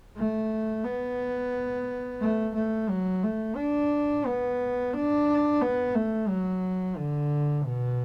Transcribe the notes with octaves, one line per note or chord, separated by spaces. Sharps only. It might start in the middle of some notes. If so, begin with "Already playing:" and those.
A3
B3
A3
A3
F#3
A3
D4
B3
D4
B3
A3
F#3
D3
B2